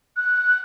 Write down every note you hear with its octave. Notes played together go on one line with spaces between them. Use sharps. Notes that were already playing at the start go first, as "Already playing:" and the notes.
F#6